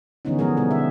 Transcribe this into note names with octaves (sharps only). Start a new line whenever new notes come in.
D3 E3 F#3 B3 C#4 D#4
F3 G#3 B3 G#4 A#4
B2 G3 G#3 B3
D3 E5